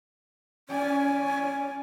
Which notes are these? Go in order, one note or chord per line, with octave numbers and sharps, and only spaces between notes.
C#4 D5 G#5